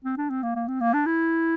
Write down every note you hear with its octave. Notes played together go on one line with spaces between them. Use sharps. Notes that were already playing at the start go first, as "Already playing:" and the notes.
C4
D4
C4
A#3
A#3
C4
A#3
D4
E4